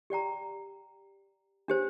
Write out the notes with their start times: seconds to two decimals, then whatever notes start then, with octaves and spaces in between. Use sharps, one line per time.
0.10 G4 D5 G5 A#5
1.68 D4 G4 C5